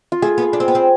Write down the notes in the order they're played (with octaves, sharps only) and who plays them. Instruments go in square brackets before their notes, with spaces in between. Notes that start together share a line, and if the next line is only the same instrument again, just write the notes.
[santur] F4
[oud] A3 [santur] G#4
[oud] B3
D4
C4
B3
C4